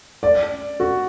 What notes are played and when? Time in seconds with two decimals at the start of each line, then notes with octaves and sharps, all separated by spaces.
0.23 D5
0.80 F#4